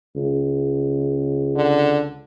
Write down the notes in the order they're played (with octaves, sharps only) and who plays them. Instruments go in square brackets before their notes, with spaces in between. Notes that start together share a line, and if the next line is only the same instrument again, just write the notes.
[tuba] C#2
[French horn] D3